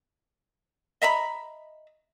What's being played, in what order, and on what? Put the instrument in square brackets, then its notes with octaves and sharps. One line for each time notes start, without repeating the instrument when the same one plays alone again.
[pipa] D#5 E5 A#5 B5